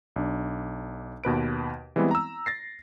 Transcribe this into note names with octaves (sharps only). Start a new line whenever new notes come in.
B1 D4
D#2 B2 B4 D7
E3 G3 G#3 B3 C4 E4
A#5 E6
A6 A#6 C7